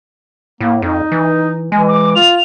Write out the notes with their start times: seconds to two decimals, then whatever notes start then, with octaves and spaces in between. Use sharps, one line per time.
0.61 A2 A#3
0.82 F2 D#4
1.12 E3
1.72 E3 G#3 G#5
1.88 D6
2.15 F4 F7